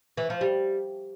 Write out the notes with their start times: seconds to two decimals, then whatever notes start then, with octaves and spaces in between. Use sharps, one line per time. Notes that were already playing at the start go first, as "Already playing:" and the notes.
0.17 E3
0.30 F3
0.41 G3